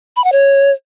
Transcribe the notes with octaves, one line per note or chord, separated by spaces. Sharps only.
B5
F#5
C#5